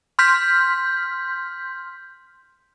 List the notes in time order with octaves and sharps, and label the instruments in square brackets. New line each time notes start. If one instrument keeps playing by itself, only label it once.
[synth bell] C6 F6 G6 B6